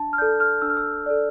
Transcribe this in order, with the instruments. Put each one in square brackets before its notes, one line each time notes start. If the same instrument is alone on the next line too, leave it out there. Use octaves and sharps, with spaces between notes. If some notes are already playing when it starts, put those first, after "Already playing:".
Already playing: [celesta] D4 A5
F6
A4 D5 G6
F6
D4 E6
F6
E6
A4 D5